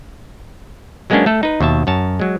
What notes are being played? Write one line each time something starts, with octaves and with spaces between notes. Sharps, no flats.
F#3 G#3 A#3 B3 C#4 D4
A3 A4
D#4 B4
D#2 B2 E5 A5
F#2 C#5 A5
F#3 G#3